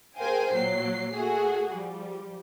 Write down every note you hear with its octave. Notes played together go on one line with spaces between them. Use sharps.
G#4 A#4 C5 F5 G5 G#5
A#2 F#3 C7
A3 F#4 G#4
F3 G3